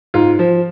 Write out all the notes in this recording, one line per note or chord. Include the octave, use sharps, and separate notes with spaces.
G#2 F4
F3